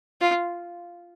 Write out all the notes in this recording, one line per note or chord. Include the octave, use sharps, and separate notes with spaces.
F4